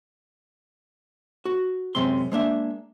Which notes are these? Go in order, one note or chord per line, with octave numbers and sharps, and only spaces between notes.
F#4
F#2 C3 G#3 C4 C6
G#3 A#3 D4 E5